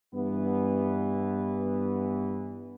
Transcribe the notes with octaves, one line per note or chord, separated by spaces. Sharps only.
G2 E3 B3